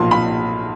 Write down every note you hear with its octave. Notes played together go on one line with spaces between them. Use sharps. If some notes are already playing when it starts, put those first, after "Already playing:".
Already playing: B1 A#2 F3 C6
B5